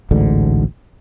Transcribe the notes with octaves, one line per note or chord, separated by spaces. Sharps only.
A1 D2 G#2 D3